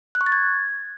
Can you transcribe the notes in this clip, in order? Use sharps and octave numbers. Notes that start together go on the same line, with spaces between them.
F#6
C#6
A6
G#6